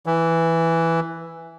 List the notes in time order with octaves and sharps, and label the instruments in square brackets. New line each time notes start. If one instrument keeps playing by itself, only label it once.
[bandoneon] E3